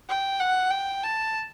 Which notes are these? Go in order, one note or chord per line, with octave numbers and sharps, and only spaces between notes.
G5
F#5
G5
A5